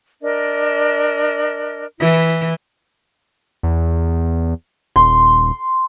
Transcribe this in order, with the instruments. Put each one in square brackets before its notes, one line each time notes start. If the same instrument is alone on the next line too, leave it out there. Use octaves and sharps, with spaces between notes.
[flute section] D4 A#4 D#5
[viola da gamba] E3 [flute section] E4
[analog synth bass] E2
[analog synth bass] D#1 [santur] C6